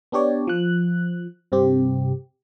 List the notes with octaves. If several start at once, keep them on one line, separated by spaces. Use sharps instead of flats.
B3 D4 G4 C#5 D5
F3 F#6
G2 C3 C4 G4